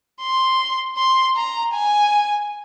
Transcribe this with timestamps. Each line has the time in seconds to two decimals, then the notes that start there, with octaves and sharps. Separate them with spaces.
0.21 C6
0.98 C6
1.36 A#5
1.74 G#5